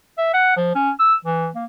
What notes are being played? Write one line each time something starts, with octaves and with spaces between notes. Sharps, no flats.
E5
F#5
F3
C#4
E6
E3
A#3